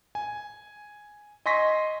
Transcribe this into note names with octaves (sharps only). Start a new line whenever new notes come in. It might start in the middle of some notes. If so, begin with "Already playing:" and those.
G#5
D#5 G#5 C6 C#6 A#6 B6